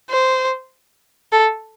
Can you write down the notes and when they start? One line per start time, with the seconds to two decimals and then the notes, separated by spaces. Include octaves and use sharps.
0.10 C5
1.33 A4